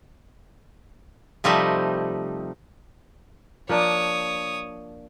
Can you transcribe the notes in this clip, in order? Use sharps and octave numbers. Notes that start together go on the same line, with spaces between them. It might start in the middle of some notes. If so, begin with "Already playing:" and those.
C3 F3 G3 A3 D#4
F3 A#3 D4 C#5 D#6